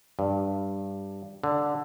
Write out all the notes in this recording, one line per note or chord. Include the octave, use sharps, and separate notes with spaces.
G2
D3